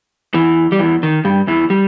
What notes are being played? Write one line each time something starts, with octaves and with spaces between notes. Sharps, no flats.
E2 E3
G3
E2 E3
D#3
G2 G3
E2 E3
G3